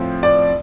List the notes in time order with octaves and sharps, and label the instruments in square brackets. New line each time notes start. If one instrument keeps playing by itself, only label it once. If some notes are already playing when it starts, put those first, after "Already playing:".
Already playing: [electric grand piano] A2 F3 C4 F4
[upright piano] D5